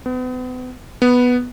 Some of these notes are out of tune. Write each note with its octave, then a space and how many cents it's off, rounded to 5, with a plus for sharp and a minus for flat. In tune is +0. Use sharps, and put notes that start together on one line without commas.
B3 +40
B3 +0